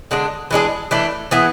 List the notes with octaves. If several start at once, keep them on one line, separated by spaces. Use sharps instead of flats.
D3 G#3 D4
E3 G#3 D4 G#4
E3 A3 D4
E3 B3 E4 G#4